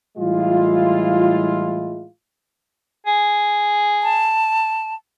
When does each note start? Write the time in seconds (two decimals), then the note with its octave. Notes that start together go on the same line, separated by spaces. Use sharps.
0.18 A2 E3 G3 G#3 E4 F4
3.07 G#4
4.03 A5